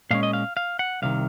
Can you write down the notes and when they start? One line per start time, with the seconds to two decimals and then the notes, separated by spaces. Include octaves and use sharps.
0.11 A#2 G#3 C#4 F5
0.23 D#5
0.33 F5
0.57 F5
0.79 F#5
1.02 C2 C3 D#3 F5